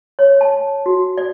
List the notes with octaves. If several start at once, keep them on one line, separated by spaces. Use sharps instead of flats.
C#5
A5
F#4
D5